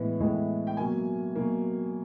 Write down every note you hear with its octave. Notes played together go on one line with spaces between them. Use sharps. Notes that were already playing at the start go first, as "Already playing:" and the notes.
Already playing: A2 E3 G#3 B3
A2 E3 G#3 B3
G5
B2 F#3 A#3 G#5
B2 F#3 A#3